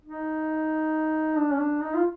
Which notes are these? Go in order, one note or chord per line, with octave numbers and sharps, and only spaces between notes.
D#4
D4
C#4
D4
D#4
F4